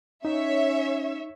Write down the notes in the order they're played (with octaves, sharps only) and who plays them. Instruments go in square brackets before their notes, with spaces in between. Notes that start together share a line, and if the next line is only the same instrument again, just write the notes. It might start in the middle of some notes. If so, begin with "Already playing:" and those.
[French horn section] C#4 [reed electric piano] D#4 [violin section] C#5 E5